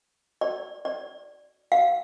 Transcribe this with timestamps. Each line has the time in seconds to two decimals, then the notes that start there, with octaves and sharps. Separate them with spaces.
0.41 D5
0.85 D5
1.72 F5